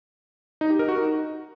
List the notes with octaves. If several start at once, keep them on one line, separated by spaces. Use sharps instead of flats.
D#4
G4
A#4
F#4
D#4